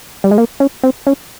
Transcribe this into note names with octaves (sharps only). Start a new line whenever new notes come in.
G3
G#3
A#3
C#4
C4
C#4